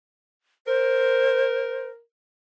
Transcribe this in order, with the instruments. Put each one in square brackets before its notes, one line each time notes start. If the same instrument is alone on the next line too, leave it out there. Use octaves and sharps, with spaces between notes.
[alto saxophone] A#4 [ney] C5